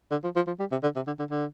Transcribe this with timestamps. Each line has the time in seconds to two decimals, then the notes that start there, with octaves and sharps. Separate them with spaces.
0.11 D3
0.24 F3
0.36 F3
0.47 F3
0.59 G3
0.72 C3
0.83 D3
0.96 C3
1.07 D3
1.19 D3
1.30 D3